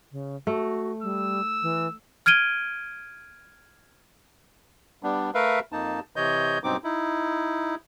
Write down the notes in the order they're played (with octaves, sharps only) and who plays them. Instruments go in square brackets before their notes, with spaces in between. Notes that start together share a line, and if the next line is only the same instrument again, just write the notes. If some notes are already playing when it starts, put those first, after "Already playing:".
[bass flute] C#3
[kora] A3 [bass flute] F#4
[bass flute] G3 [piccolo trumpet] E6
[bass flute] E3
[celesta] F6 G#6 D7 D#7 G7
[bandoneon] G3 B3 D4
A3 A#4 B4 E5 F5
F2 A#3 D#4 A5
C3 E3 C#5 D#5 G6
G2 B2 F#3 C4 D#4 D6
D#4 E4